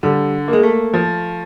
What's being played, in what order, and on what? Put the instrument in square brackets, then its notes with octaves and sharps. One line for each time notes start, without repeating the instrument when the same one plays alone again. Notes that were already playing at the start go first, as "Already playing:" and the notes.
[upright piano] D3 [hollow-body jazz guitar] G3
[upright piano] A#3
[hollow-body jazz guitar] G#3
A3
[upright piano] F3